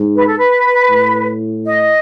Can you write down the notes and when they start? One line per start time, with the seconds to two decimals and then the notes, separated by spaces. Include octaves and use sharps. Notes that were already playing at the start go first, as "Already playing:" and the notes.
Already playing: G#2
0.16 B4
0.27 A4
0.38 B4
0.90 A2
1.65 D#5